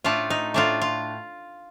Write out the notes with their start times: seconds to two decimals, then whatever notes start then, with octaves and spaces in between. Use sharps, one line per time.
0.04 A2 A3 D4 F4
0.30 D#4
0.54 A2 A3 D4 F4
0.81 F4